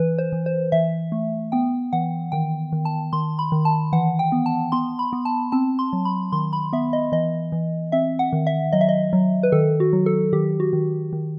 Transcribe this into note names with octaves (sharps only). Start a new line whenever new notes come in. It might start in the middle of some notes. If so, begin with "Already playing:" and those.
Already playing: E3 B4
C5
E3
C5
E3 E5
A3
B3 G5
E3 F#5
D#3 G5
D#3
A5
D#3 C6
B5
D#3
A5
E3 F#5
G5
B3
A5
B3 C6
B5
B3
A5
C4 A5
C6
F#3
B5
D#3 C6
B5
B3 E5
D#5
E3 D#5
E3
C4 E5
F#5
D#3
E5
F#3 D#5
E5
D#5
F#3
B4
D#3 A4
F#4
F#3
A4
D#3 G4
F#4
D#3
D#3